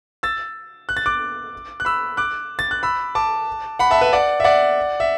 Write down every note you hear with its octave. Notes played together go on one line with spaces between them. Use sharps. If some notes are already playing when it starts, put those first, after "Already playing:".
E6 A6
F#6
A6
D6 F#6
F#6
B5 E6
D6 F#6
A6
F#6
B5 E6
A5 D6
F#5 B5
E5 A5
B4 E5
D5 F#5
E5
D5 F#5
E5